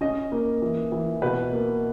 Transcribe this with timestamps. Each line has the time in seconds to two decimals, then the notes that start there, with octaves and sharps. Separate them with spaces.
0.01 C#4 D#5
0.32 A#3
0.62 E3
0.92 E3
1.22 B2 B4
1.52 A#3